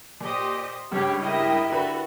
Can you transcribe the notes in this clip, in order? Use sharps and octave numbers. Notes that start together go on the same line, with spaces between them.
A#2 G4 C5 D#5
C#2 G2 D4 G4 C#5
E4 G4 A#4 D#5
D3 F#4 A4 B4